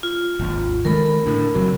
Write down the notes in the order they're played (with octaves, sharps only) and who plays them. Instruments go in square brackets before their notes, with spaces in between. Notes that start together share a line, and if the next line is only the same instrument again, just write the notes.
[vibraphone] F4
[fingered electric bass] G#1 D#2
[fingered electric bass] D#3 G#3 A3 [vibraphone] A#4 B5
[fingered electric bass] A2 D3
F#1 C3 F#3